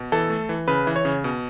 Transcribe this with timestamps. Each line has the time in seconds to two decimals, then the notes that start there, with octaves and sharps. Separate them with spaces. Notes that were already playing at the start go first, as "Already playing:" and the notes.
Already playing: B2
0.12 E3 A4
0.30 A3
0.49 E3
0.68 C#3 B4
0.87 E3
0.96 C#5
1.05 C#3
1.24 B2